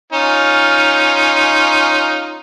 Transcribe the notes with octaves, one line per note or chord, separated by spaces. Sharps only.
C#4 D#4 F4